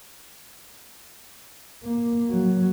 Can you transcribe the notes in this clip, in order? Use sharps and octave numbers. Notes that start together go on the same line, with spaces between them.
A#3
F#3